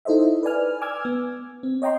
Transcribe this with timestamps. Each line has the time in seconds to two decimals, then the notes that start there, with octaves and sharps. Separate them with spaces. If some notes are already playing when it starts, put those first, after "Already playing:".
0.05 D#4 E4 A4 C5 D#5 E5
0.43 B4 D5 G#5 F6
0.81 G#5 D6 E6 F6 G#6
1.05 B3
1.63 C4
1.82 C#5 D#5 G5 A#5 C6